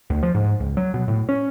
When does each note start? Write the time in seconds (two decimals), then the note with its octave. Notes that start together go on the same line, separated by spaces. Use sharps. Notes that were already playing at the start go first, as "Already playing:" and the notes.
0.10 D2
0.23 F3
0.35 G#2
0.60 C#2
0.77 F#3
0.94 B2
1.08 A2
1.29 C#4